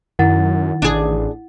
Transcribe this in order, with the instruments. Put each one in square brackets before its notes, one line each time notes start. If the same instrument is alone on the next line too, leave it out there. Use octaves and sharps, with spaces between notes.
[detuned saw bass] F#2 [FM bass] D#3 [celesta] E4 F#5 A6
[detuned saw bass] A1 [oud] D4 G#4